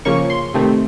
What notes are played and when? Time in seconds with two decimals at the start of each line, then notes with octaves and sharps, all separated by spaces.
0.05 C#3 F3 A#3 C#4 C#6
0.30 C6
0.54 C3 D#3 A3 C4